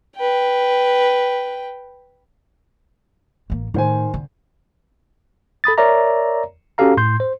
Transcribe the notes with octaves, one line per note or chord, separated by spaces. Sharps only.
B4 G5
A1 A#3
A2 D#3 C5 G#5
D3
A4 B5 D#6 A6
A#4 C#5 D5 E5 A#5
C#4 F#4 G4 A4 F5 A#5
A2 C6 G6
C5